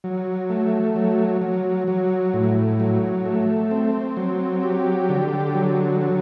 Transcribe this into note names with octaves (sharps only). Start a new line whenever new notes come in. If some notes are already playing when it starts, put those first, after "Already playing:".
F#3
A3
F#3
F#3
F#3
A2
F#3
A3
C4
F#3
G4
D3
F#3
F#3